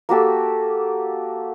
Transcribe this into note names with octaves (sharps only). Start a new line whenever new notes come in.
A#3 F#4 G4 A4